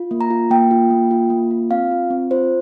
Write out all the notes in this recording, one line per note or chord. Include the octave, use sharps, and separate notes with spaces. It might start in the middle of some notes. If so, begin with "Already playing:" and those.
Already playing: F4
A#3
A#5
F4
A#3 G5
F4
A#3
F4
A#3
F4
C4 F5
F4
C4
F4 C5